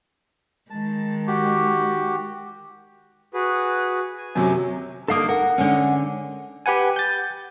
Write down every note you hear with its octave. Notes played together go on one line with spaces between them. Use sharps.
D#3 G#3 A5
F#4 G4
F#4 G#4 B4
G#5
F#2 C3 F#3
D3 A#3 D#4 A4 F5 D#6
A#4 F#5
D3 G#3 C#4
G4 B4 F#5 G#5
G6 A6